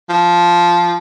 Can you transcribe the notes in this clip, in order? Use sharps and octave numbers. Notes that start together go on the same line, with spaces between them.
F3